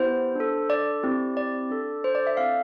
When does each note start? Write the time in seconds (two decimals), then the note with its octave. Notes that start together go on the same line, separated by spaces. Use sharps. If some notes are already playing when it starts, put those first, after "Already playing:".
Already playing: B3 E4 G4 C5
0.35 D4 A4
0.70 D5
1.03 C4 E4 G4
1.37 D5
1.70 D4 A4
2.04 C5
2.15 D5
2.27 E5
2.37 C4 E4 A4 F5